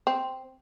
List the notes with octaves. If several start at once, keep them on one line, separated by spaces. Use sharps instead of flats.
C4